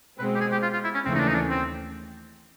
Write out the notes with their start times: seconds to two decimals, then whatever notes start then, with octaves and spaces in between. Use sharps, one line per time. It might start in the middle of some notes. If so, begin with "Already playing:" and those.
0.19 B2 G#3 C4 B4
0.35 G4
0.41 G#4
0.52 G4
0.62 F4
0.73 F4
0.84 E4
0.94 C#4
1.05 D#2 C#3 E3 A3 C4 C#4
1.15 D#4
1.20 D4
1.28 D#4
1.35 D4
1.49 C4